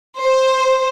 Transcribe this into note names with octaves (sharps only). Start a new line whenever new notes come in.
C5